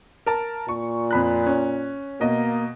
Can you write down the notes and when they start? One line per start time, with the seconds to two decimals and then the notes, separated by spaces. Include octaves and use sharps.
0.26 A#4 A5
0.69 A#2 C#6
1.11 F2 B5 F#6
1.46 C#4
2.21 B2 A#3 D#5